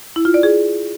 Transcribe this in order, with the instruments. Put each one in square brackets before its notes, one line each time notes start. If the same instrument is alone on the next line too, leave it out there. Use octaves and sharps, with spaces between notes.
[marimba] E4
F4
D5
G#4